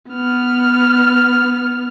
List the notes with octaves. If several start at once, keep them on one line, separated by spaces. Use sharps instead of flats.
B3 F6